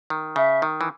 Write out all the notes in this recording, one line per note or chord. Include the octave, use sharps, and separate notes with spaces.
D#3
C#3 E5
D#3
E3